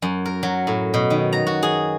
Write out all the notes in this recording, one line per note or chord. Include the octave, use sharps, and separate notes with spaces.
F#2
A#4
F#3
A2
B2
D#3
A#5
F#4
G#4